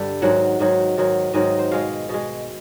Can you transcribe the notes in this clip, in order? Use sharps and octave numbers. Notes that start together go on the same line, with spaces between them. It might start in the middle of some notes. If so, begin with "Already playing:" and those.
Already playing: G2 D3 G3
G#2 D#3 F#3 F#5
G#2 D#3 F#3
G#2 D#3 F#3
G#2 D#3 F#3 D#5
C5
B2 G#3 F5
B2 G#3